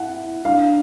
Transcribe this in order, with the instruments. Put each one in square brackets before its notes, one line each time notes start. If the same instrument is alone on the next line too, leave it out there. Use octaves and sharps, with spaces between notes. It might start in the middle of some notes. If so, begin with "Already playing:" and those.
Already playing: [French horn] E4 [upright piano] F#5
[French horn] D4 [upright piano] F5